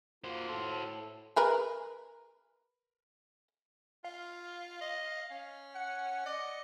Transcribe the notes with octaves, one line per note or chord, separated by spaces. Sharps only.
A#3 F4 F#4 C5
A2 A4
G#4 A#4 B4
F4 F5
D#5
C#4
F#5 C#7
D5 D#5